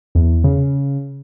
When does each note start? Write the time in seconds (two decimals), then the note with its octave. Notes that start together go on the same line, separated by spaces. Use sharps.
0.15 E2
0.44 C#3